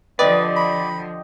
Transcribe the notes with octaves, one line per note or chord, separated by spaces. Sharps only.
D3 F3 G4 B4 D5 D#5
B5